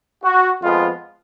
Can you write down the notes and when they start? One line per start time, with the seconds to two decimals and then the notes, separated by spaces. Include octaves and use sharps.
0.24 F#4
0.62 F2 F3 G#3 B3 F4